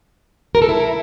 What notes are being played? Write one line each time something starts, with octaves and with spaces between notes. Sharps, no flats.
A#4
A4
E4